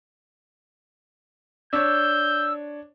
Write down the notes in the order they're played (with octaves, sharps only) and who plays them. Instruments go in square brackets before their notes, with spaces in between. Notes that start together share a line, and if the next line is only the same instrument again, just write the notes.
[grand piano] D4 C#5 [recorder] E6 [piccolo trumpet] G6